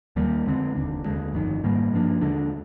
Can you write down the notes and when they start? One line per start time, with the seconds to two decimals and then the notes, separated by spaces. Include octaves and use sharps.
0.16 D#2 D#3 G3 A#3
0.45 F2 D3 G#3 C4
0.75 F1 D#2 D3
1.05 D#2 D3 G#3
1.34 G1 F2 D#3
1.63 G#2 D#3 G3 A#3
1.92 G2 F3 A#3 D4
2.21 D#2 D3 G#3 D4